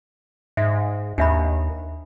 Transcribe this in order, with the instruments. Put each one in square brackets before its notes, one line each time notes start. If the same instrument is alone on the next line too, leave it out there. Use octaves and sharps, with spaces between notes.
[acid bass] G#2 [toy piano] E5
[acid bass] D#2 [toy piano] D4 E5 B5